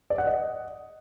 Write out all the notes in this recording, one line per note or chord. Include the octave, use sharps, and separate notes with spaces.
D5
F#5
D#5